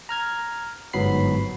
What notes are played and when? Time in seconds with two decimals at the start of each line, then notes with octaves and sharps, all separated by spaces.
0.09 A#5 F6 G#6
0.93 G1 G#2 F#3 B3 B5 C7